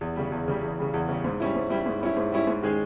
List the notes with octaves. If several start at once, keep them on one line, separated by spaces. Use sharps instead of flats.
E2
C#3 G3
E2
C#3 G3
E2
C#3 G3
E2
C#3 G3
G#2
G3 C#4 E4
G#2
G3 C#4 E4
G#2
G3 C#4 E4
G#2
G3 C#4 E4
G#2
D#3 G#3 C#4 G#4